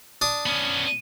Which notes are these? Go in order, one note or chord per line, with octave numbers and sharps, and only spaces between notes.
D4 D#6
B3 C#4